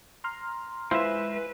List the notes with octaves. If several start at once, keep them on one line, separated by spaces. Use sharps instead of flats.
A#5 C6 F6
G#3 E4 F4 B4 C5 E5